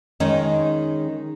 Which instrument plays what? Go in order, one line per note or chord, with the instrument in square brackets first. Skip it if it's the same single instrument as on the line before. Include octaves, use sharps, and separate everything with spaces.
[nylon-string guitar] D#3 G#3 C#4 D#4